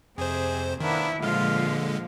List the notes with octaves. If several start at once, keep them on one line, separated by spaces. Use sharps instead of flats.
F2 C3 G#4 C5
D#3 A#3 B3 D4 E4
A#2 D3 F3 G#3 F4 F5